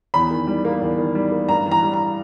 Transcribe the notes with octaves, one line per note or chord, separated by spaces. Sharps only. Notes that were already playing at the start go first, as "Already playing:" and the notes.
E2 B5
D#3
G3
A#3
E2
D#3
G3
A#3
G2 A#5
E3
A#5
G3
A#5